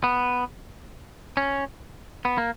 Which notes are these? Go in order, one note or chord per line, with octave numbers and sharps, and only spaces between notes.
B3
C#4
B3
A#3